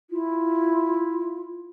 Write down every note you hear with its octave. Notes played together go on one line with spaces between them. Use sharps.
E4 F4